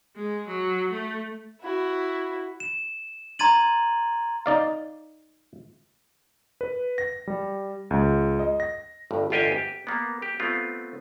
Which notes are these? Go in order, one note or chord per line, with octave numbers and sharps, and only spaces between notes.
G#3
F#3
A3
E4 F#4
E7
A#5 C6 G#6 A6 D#7 F#7
D#4 D5 F5
B4
A#6
G3
C#2
D#5
A#6
G1 G2
G1 E2 F4 G4 D#5 G#5
G4
A#3 B3
G4
A3 B3 C4 F4